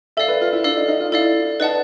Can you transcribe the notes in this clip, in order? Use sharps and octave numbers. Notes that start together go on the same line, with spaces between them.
A4 D5 E5 F5
B4
F4
E4
D4 A4 D5 F5
D#4
D#4
F4
E4 A4 D5 F5
D#4 B4 D5 F#5 A5